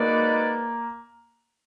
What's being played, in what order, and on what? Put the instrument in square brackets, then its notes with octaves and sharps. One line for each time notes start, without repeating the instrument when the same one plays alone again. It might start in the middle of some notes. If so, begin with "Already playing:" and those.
Already playing: [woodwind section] G#3 D#4 F#4 B4 D5 [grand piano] A#3